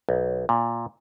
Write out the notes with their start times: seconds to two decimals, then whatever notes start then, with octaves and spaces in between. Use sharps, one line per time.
0.09 B1
0.49 A#2